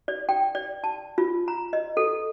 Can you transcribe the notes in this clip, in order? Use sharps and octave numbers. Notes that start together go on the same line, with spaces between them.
D5
G5
D5
A5
F4
A#5
D#5
A4